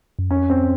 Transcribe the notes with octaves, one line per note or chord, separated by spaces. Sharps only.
F#2
F2 C#4
C4